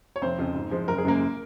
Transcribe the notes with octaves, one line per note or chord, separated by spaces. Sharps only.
C#5
F1 C4 C5
F2 C#3 F3
G#2
F3 G#3
F#1 A#4
G#4
F#2 C#3 G#3 A#3 A#4